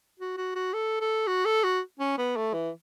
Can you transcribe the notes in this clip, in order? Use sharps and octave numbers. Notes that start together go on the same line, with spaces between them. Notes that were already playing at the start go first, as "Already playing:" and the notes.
F#4
F#4
F#4
A4
A4
F#4
A4
F#4
C#4
B3
A3
E3